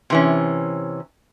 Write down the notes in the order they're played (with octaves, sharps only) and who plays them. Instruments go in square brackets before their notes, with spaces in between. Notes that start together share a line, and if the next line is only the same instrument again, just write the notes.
[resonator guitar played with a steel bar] C3 E3 C#4